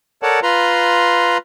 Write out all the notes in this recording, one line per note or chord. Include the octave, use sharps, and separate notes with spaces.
A4 A#4 C#5 D5 F#5 A5
F4 B4 A#5 C6